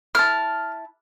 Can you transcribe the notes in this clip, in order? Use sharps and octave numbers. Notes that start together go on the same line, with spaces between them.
E4 A5 F6